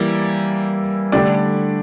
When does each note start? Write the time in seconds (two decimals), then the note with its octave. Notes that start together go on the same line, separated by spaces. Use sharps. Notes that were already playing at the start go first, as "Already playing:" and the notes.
Already playing: E3 G3 A#3 E4
1.12 D3 A3 D4 G4 D5